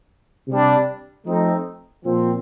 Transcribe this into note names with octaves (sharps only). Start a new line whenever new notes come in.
C3 G3 D4
F3 A3 C4 D#4
A#2 F3 C4